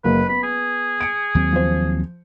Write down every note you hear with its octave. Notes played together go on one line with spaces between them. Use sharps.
F#1 F#3 A#3 B4
B3 B5
G#4
C#7 D7
D#2 F#3 C4
F3 C5